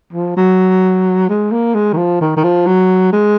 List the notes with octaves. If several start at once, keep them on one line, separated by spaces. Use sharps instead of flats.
F3
F#3
G#3
A#3
G#3
D#3
F3
D#3
D#3
F3
F#3
G#3